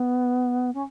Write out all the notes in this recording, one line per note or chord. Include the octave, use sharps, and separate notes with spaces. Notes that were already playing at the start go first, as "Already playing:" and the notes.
Already playing: B3
C#4